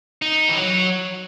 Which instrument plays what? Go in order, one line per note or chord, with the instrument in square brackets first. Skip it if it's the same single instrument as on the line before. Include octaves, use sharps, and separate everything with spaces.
[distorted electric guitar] D#4
E3
F#3